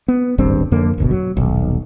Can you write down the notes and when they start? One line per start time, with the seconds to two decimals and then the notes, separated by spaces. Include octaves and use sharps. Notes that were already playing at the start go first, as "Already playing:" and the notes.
0.08 B3
0.38 D#1 G#1 G2 C4
0.72 F2 D3 A#3
0.98 D1 G1 B2
1.11 F#3
1.37 D#1 B1